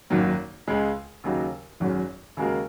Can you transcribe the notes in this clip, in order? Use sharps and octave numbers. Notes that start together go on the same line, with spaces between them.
G#1 F#2 D#3 F#3 A#3
C#2 C#3 G#3
D#2 C#3 F#3 D#4 F#4
G#1 F#2 F#3 C#4 G#4
D#2 C#3 G#3 F#4 A#4